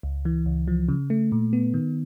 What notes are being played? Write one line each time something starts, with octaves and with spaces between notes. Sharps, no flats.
C#2
E3
C#2
F3
C#3
A3
A#2
B3
D#3